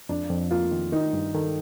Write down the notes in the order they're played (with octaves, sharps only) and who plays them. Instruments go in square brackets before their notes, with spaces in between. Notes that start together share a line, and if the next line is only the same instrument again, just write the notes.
[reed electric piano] F2 [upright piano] D4
[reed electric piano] F2
[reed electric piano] A#3 [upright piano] F4
[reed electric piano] D#3
[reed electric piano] D#3 [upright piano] D#4
[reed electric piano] G2
[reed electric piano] D#3 [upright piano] A4